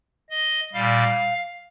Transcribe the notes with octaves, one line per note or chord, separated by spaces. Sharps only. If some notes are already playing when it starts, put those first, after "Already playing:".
D#5
A#2 G3 F5